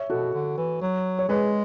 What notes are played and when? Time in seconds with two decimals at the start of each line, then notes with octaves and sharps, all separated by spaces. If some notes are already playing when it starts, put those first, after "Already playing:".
Already playing: C#5 E5
0.10 B2 F#4 A4
0.34 D3
0.58 E3
0.81 F#3
1.19 C#5
1.29 G#3 G#4 B4